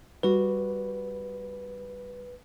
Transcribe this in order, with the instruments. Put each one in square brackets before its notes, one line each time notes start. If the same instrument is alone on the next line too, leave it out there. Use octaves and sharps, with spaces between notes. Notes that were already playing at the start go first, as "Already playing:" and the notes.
[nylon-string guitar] G3 F#4 [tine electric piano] B4